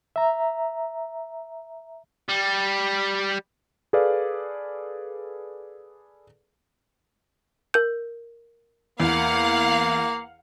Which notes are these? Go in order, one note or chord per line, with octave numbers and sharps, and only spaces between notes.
E5 A#5
G3
G#4 A4 B4 D5 F5
A#4 G6
E2 A#3 F5 F#5